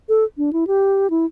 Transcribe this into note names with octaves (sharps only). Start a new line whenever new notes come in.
A4
D4
E4
G4
E4